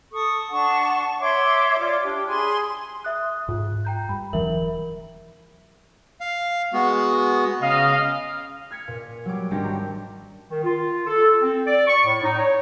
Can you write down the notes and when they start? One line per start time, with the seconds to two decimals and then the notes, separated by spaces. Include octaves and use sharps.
0.12 A4 C#6 D#6
0.50 D4 F#5 A5 C#6
1.20 C#5 E5 C6 D6
1.78 F4 C#5 D5 D6
2.03 D4 G4
2.27 G#4 G#5 B5 C6
3.04 E5 D#6 F#6
3.49 G#2 F4
3.85 G5 A#5 G6
4.09 G2 B5
4.33 E1 E3 F#3 A#4 E5 F#7
6.21 F5
6.73 G#3 B3 F#4
7.62 C#3 D#5 F5
8.71 F6 G#6 B6 C#7
8.88 A#2
9.26 F#3 G3 D6
9.51 G#1 G3 D4 G4 C#6 A#6
9.64 A#5
10.50 D#3
10.64 F4
11.07 A4
11.42 C4
11.67 D5
11.88 C#6
12.05 A2
12.23 D#4
12.38 C#5